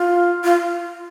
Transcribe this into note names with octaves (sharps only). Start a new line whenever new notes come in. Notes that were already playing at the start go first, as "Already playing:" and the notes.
Already playing: F4
F4